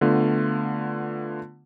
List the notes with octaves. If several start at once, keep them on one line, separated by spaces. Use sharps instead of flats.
D3 A3 B3 F4